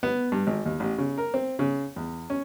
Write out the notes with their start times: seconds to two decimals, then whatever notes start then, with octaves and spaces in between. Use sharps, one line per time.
0.03 B3
0.32 G2
0.47 G#1
0.66 D#2
0.80 A1
0.98 C#3
1.18 A#4
1.34 C4
1.59 C#3
1.96 E2
2.30 C#4